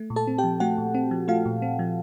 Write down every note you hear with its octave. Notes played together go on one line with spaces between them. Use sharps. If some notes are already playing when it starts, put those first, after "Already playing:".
Already playing: A3
A#2
A4 A5
C4
G4 G5
F3
A3 F#4 F#5
A#2
C4
F3
A3 F4 F5
A#2
C4
F3